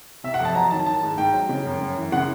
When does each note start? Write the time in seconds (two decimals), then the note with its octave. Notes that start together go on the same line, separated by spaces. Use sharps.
0.24 C3 E5
0.34 F#5
0.40 F2
0.45 A5
0.55 F#3 A#5
0.71 D#3 A5
0.86 D#3 A5
1.03 G#2
1.18 G#2 G5
1.33 F#3
1.49 C#3
1.65 F#2
1.81 F#2
1.97 E3
2.12 C#3 F#5